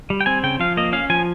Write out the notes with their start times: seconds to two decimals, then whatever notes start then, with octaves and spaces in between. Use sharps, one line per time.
0.10 G3
0.21 G5
0.26 C4 G#5
0.43 C#3 G5
0.59 F3 F5
0.77 A#3 D#5
0.93 C#4 F5
1.10 F3 G#5